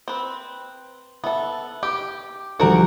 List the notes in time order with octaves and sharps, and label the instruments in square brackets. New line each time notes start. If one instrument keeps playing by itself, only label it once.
[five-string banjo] C4 B4
[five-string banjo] B3 A4 [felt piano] E5
[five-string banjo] G4 [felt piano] D6
[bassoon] D2 [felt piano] F3 G3 [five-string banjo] F#4 A#4 F#5